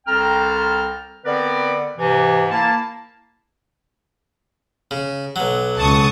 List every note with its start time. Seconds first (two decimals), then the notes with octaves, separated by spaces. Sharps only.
0.07 C2 C4 A4 G5 A#5 F6
1.25 D3 B3 C4 A#4 B4 D5
1.98 G#2 C3 E3
2.50 A#3 E4 A5
4.91 C#3
5.36 B1 F#3
5.78 C#2 A5 C#6 D#6